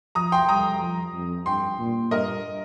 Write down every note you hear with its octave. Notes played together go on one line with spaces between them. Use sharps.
F3 A#5 D#6
G5 C6
G3 A#5 D#6
F3
F2
G2 G5 C6
A#2
G2 A#4 D#5